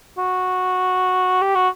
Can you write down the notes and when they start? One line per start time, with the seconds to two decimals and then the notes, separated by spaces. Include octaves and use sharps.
0.18 F#4
1.41 G4
1.55 F#4